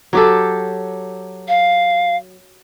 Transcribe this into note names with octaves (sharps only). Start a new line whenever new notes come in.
F#3 G4 A4
F5